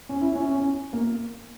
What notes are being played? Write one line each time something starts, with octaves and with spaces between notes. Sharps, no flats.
C#4
E4
C#4
C#4
A#3